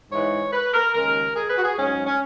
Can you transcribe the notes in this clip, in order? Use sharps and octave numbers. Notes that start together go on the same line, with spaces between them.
G#2 E3 G#3 C#5
B4
A#4
D#2 C#3 G#3 A#4
G#4
B4
F#4
G#4
G#2 F#3 C#4
C#4